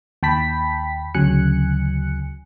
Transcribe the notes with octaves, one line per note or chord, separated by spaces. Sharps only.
D#2 G5 A5 B5 B6
D2 C#3 F#3 G#5 F#6 C#7